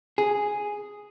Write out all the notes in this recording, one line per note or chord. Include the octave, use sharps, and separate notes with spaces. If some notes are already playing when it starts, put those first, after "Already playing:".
G#4